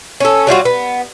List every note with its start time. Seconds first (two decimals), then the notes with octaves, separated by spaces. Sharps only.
0.20 C#4 D4 A4
0.47 F#3 G3 F4 F#4
0.65 B3